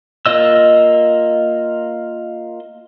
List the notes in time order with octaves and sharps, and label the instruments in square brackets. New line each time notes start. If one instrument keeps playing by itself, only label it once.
[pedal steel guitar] A#3 F4 D#5 E6